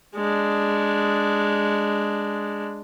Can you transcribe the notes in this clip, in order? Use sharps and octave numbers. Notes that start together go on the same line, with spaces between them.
G#3 D4